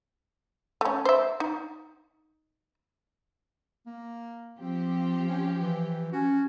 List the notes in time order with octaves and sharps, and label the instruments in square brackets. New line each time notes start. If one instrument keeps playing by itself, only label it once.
[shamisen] A3 C#4
C5 E5
D#4
[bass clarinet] A#3
[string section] F3 G4 [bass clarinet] C4
[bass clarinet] C#4
E3
[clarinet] C#4 [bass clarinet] F#4